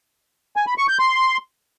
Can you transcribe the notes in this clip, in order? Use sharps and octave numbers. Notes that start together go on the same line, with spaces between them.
G#5
B5
C#6
G6
C6